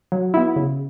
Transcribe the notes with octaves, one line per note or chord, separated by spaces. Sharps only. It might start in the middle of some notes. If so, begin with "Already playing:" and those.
F#3
B3 E4
C#3